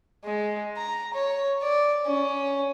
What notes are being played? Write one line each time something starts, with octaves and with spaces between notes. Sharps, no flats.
G#3
A#5
C#5
D5
C#4